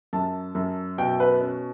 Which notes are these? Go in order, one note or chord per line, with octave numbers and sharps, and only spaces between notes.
F#2 A5
F#2
B2 G5
B4
C#4